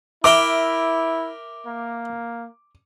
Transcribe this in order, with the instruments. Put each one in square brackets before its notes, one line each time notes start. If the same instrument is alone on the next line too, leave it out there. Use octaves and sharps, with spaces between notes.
[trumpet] E4 [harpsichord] A#4 E5 G5 [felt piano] D6
[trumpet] A#3